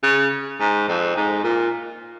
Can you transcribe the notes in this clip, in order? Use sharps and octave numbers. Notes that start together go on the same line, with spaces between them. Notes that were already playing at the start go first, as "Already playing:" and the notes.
C#3
G#2
F2
G#2
A#2